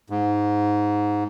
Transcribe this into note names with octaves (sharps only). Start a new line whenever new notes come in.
G#2